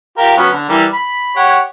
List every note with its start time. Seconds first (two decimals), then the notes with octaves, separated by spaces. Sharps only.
0.18 F4 G4 A#4
0.37 F#3 B3 C#4
0.51 D3
0.69 E3 G3 A#4
0.93 B5
1.36 G4 C#5 F#5